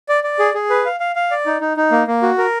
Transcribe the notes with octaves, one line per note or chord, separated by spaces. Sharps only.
D5
D5
G#4
G#4
B4
F5
F5
F5
D5
D#4
D#4
D#4
A#3
A#3
F#4
A#4